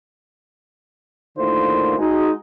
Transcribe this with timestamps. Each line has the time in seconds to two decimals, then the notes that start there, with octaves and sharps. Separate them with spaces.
1.37 A2 D3 D#3 A#3 F4 C5
1.98 G#3 D#4 F#4